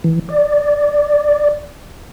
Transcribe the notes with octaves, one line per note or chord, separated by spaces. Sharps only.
E3
D5